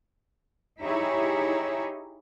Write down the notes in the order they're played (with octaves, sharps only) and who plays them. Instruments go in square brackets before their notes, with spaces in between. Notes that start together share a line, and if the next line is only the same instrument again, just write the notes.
[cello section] D#4 E4 G4 G#4 C#5 E5